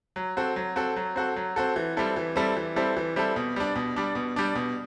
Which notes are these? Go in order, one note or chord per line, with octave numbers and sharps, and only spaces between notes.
F#3
C4 F#4 A4
F#3
C4 F#4 A4
F#3
C4 F#4 A4
F#3
C4 F#4 A4
E3
G3 C4 E4 A4
E3
G3 C4 E4 A4
E3
G3 C4 E4 A4
E3
G3 C4 E4 A4
B2
G3 D4
B2
G3 D4
B2
G3 D4
B2